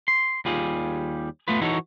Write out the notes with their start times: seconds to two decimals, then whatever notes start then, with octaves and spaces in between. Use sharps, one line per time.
0.08 C6
0.45 D#2 G3 F4 G#4
1.48 A3 B3 F4 B4
1.61 E3 D#4 F#4 A4 C#5